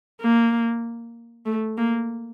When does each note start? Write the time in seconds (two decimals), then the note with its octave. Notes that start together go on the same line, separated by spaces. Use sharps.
0.21 A#3
1.46 A3
1.77 A#3